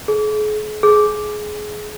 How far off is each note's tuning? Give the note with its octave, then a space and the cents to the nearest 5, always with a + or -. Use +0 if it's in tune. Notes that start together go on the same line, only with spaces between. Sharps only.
G#4 +40
G#4 +20